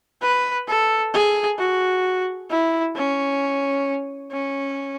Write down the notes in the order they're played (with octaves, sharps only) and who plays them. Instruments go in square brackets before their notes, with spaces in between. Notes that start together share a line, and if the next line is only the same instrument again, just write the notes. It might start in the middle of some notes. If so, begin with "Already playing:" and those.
[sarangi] B4
A4
G#4
F#4
E4
C#4
C#4